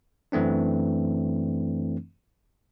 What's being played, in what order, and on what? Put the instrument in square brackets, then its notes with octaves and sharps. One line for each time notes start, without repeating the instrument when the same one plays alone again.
[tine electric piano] F#2 E3 A3 C4 D4